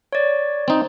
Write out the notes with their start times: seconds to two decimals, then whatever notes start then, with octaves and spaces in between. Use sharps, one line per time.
0.13 C#5 D5
0.68 C4 D#4